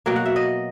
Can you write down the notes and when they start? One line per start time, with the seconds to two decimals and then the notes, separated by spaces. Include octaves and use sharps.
0.06 B2 F#3 A#3 G5
0.16 F#5
0.26 E5
0.36 D#5